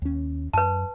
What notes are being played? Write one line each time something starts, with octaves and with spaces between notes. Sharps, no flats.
D#2 C#4
F#2 B4 A5